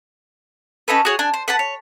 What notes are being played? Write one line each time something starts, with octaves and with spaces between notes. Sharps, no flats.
C#4 D#4 A4 B4
F#4 G#4 C#5
D4 G#5
C5
B4 F#5 A5
C#5